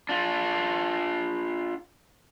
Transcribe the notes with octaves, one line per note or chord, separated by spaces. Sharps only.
D4 F4